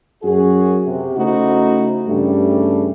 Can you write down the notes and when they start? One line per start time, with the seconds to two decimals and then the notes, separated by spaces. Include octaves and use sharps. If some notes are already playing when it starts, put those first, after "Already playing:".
0.23 F#2 F#4 G#4
0.86 C3
1.16 C#3 A3 D#4 E4 F#4 C5
2.08 G2 C#3 E3 G3 A3